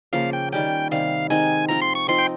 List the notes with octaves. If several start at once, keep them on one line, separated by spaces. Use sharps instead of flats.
C#3 F3 A#3 F5
G5
D#3 G3 C#4 G5
C3 D#3 G3 F5
D#3 G#3 C4 D#4 G#5
F3 C4 F4 A#5
C6
C#6
F3 C4 D#4 A#4 C6
G5